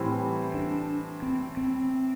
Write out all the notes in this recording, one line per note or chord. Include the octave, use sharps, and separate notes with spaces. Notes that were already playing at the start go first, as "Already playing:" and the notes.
Already playing: A2 E3 G3 C4
D4
C4
C4